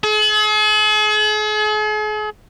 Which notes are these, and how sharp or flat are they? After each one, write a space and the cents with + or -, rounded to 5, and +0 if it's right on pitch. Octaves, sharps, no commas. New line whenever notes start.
G#4 +45